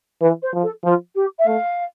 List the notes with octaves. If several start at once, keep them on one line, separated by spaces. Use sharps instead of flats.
E3 B4
C5
F3
A4
F3 F4
G4
E5
A3 F5